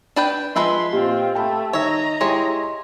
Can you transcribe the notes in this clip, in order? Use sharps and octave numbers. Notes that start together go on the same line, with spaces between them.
D4 B4 G5
F3 G#3 B4 E5 B5 C6
A#2 C4 F4 G4
A3 G5 A5 B5
D#3 C#5 D#5 E5 A#5
G#3 E4 G4 G#4 C#5 C6